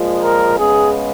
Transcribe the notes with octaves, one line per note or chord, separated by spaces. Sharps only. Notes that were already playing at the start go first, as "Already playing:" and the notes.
Already playing: A#2 F3 G#3
A#4
C#3 G#3 B3 G#4